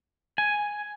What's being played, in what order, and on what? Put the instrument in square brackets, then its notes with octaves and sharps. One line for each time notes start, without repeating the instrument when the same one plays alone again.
[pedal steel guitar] G#5